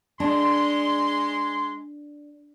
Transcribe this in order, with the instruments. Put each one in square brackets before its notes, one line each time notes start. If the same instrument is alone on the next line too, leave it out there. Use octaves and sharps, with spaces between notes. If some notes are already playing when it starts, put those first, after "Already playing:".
[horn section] G#3 C6 [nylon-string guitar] D4